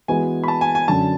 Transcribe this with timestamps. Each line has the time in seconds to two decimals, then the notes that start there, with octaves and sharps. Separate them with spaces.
0.08 E3 G#3 B3 F#4 B4 G#5
0.44 B5
0.48 A5
0.61 G#5
0.75 G#5
0.88 F#2 D3 F#3 C#4 A5